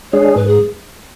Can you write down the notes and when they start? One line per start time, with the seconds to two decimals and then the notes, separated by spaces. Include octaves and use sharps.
0.12 G#3 D4 G#4 C#5
0.35 G#2 B4
0.47 G#4